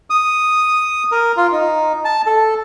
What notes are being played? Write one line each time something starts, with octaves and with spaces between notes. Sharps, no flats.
D#6
A#4
F4
D#4
A5
A4